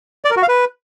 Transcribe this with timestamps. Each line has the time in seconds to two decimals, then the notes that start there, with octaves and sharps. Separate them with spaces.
0.25 D5
0.31 A#4
0.37 F#4
0.43 F5
0.48 B4